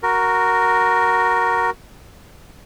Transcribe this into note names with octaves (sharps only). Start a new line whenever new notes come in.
F#4 A#4